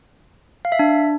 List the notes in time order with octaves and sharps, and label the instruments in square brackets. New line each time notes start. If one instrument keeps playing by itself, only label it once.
[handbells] F5
E5
D4